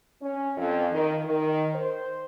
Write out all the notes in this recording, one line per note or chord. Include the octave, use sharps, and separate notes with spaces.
C#4
F2
D#3
D#3
C5